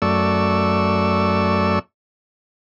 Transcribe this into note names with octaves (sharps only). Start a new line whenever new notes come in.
F#2 A3 D5 C#6 E6